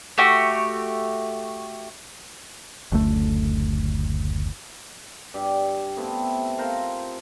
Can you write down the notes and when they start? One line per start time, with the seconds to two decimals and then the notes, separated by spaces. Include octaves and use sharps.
0.18 A3 F#4 G4
2.92 F#1 D2 A3
5.34 G2 G4
5.97 A3 B3 C4 E4
6.58 F4 A4 A#4 C5